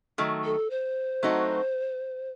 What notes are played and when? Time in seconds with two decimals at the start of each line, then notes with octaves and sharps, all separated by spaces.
0.18 D#3 F#3 A3
0.44 A4
0.70 C5
1.23 F#3 A3 C4 D#4 F#4